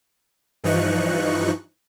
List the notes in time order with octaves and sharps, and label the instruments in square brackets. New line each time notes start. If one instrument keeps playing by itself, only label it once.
[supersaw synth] G2 E3 F3 D#4 C#6 F#6